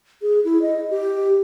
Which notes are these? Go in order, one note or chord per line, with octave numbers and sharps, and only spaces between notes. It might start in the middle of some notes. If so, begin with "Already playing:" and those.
G#4
E4
D#5
G4